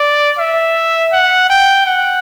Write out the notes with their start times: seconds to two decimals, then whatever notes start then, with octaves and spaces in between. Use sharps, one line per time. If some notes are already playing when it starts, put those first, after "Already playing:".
Already playing: D5
0.38 E5
1.13 F#5
1.50 G5
1.86 F#5